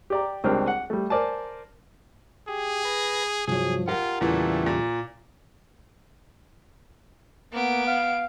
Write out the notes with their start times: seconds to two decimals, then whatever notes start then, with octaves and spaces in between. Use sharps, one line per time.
0.10 G4 D5 A#5
0.44 C#2 G3 C4 D4 A#4 F6
0.68 F#5
0.90 G3 A3
1.10 A#4 C5 D5 G#5 A5
2.49 G4 G#4
2.85 B4 A#6
3.48 C2 G2 F3 F#3 G#4
3.88 F4 G4 A#4 F#5
4.21 E2 A#2 C#3 E3 G3 A3
4.66 A#2
7.53 A#3 B3 D7
7.86 F5